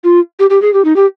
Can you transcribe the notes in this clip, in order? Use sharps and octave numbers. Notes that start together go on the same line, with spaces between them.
F4
G4
G4
G#4
G4
D#4
G4